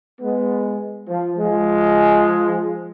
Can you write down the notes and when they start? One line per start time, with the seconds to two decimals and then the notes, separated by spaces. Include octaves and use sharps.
0.21 G#3 B3
1.08 F3
1.38 F3 G#3